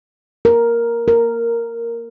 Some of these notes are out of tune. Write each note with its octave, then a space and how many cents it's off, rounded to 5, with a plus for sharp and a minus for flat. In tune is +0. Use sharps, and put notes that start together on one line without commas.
A#4 +5
A#4 -5